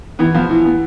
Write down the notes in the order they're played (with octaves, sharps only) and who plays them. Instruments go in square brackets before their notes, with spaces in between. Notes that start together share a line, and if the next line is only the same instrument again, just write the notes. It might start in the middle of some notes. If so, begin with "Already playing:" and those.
[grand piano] E3 [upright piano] B3
[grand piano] F3 [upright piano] B3
[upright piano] E3
B3